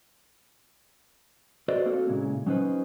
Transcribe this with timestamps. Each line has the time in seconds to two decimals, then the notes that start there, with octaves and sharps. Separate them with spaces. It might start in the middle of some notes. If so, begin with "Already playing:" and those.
1.68 F#4 A4 B4 C5 D5 D#5
1.85 A#3 C4 D4 F#4 A4 A#4
2.08 A#2 C#3 G#3 E4
2.46 F#3 C#4 D#4 G#4 B4 C5